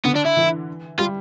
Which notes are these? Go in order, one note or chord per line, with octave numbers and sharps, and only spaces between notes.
D3 B3
D4
E4
E3
G3 F4